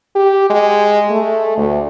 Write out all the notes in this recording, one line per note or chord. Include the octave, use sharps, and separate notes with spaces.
G4
G#3
A3
D2